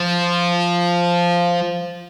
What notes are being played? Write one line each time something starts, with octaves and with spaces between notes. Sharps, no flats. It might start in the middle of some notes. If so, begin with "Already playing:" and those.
Already playing: F3